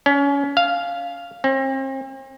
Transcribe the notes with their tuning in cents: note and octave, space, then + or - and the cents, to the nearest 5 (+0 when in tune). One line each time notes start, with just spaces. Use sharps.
C#4 +30
F5 +0
C4 +40